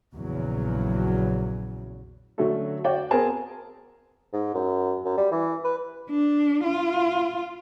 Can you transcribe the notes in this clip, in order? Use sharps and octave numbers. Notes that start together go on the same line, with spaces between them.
A#1 E2 C#3 F#3
D3 F#3 A3 C#4 F#4 A4
F#4 D5 G5
B3 C4 G#4 A#4 G#5 A5
G#2
F#2
F#2
G3
E3
B4
D4
F4